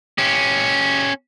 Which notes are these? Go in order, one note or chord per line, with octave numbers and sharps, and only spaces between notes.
C#4 G4